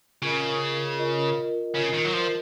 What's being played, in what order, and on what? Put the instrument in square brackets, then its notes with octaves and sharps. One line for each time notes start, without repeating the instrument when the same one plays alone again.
[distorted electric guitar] C#3 [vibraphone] F4 A#4 D#5
[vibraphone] F4 A#4 D#5
[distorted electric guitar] C#3 [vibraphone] F4 A#4 D#5
[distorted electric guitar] D#3
F#3
F3